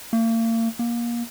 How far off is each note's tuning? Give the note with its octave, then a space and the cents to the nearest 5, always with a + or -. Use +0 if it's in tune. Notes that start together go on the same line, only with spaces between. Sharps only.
A#3 -40
A#3 +25